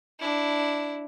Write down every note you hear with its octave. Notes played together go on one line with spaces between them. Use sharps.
D4 E4